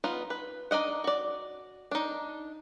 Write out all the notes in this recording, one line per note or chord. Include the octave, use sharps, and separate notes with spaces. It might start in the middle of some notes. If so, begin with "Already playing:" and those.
B3 D#4 F4
B4
D4 D#4 D5 D#5 F#5
F#4 D5
D4 D#4